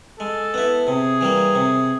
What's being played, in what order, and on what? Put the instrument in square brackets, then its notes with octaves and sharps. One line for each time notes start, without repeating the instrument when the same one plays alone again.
[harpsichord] G#3 [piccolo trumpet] A4
[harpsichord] B3 E4
[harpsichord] C3 [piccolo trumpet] G#4
[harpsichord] E3 G3 A#3
C3